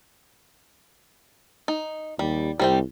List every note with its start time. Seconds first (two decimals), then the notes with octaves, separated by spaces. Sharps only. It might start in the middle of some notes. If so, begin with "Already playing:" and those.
1.68 D#4
2.19 D#2 G3
2.59 C2 G3 C4 G5